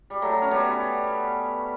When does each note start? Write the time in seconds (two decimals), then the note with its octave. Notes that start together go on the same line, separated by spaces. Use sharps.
0.10 G3
0.22 F#3 A3
0.42 C#4
0.51 G3 B3